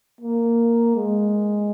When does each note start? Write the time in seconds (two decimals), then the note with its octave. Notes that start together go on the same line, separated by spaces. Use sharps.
0.21 A#3
0.96 G#3